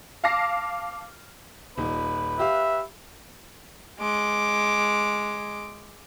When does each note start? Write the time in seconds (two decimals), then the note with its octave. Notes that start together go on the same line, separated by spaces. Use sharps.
0.24 F5 A5 D6 F6 A#6 C7
1.78 D#1 D#4 B4
2.39 G4 E5 F5
3.99 G#3 D6